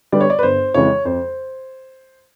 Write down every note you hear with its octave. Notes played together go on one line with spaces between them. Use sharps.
D3 G3 B3 D5
C#5
D5
B4
G1 C5
F2 C#3 E3 G#3 C#5
F2 C5